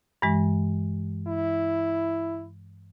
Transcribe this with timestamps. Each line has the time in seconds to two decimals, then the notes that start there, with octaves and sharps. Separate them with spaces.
0.22 G2 E3 G#3
1.27 E4